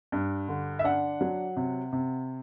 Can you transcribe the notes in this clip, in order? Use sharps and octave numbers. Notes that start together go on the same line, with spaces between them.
G2
D3
E5
D4 F#5
F#3
C3
C3